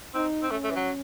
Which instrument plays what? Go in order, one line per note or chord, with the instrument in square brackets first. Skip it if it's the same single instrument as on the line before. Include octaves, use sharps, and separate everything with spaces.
[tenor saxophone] C4 [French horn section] D#4
[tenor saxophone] C4
[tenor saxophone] A3 [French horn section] C#4
[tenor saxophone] A3
E3
F#3